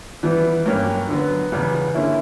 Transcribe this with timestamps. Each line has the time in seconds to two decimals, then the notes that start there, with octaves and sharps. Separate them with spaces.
0.23 E3 G3 B3
0.66 G2 F#3 A#3 C#4 G4
1.09 D3 F#3 B3
1.52 E2 C#3 G3 B3
1.95 D3 A#3 C#4 E4